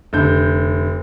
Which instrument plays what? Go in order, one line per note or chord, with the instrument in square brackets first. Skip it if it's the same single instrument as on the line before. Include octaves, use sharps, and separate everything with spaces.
[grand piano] F1 D3 G6